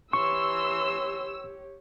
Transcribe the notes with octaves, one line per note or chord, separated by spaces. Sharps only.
E3 G4 C#5 C6 C#6 E6